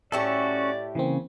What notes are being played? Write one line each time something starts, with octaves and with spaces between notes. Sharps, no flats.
A2 C#4 F#4 G4 A4 D5 E5 A5
C#3 E3 A#3 C4